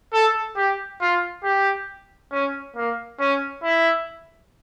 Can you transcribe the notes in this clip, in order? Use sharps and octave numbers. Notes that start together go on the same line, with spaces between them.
A4
G4
F4
G4
C#4
A#3
C#4
E4